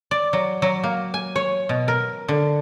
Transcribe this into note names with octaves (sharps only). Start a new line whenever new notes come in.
D5
F#3
F#3
A#3
G#5
C#5
B2
A#4
D3